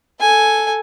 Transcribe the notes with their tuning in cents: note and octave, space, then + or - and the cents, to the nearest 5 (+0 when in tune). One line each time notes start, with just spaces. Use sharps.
A4 +0 G#5 +0